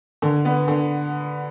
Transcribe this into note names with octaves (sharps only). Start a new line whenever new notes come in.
D3
B3
D3